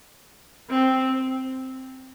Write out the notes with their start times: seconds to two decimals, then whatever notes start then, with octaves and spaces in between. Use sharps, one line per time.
0.70 C4